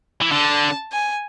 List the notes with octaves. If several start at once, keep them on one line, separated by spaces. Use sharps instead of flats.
E3
D3 A5
G#5